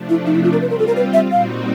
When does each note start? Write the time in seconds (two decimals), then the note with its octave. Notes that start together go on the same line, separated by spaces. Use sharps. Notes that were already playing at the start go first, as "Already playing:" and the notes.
Already playing: C3 F3 A3 D4
0.09 E4
0.27 D#4
0.35 E4
0.44 F4
0.53 A#4
0.61 G3 C4 F4 B4
0.70 A#4
0.79 A4
0.87 A#4
0.97 B4
1.13 E5
1.31 A#2 G3 C4 D#4 F#4 F5